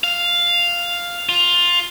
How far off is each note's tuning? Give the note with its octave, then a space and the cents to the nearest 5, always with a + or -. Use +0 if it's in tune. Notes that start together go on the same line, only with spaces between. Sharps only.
F5 +0
F4 +10